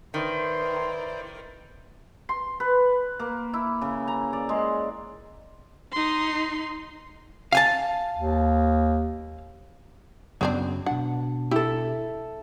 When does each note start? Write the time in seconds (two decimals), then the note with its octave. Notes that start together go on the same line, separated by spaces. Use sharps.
0.14 D#3 E4 B4 C5 D5 C6
2.29 C6
2.60 B4
3.19 A#3
3.53 E4
3.81 C#3
4.08 A#5
4.33 D5
4.49 G#3
5.92 D#4 C6
7.53 F5 G#5 A5
8.15 D#2
10.41 F#2 C#3 F#3 B3 C4 D4
10.86 B2 D4 F#5
11.51 E4 G4 A4